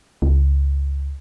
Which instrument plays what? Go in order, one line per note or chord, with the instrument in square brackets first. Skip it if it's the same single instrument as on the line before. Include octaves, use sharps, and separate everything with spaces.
[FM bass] C#2